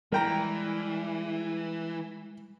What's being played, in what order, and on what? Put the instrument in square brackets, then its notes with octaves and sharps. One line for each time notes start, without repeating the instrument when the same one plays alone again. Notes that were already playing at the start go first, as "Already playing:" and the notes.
[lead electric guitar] E3 [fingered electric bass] G3 G#3 [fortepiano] A#4 G5 A#5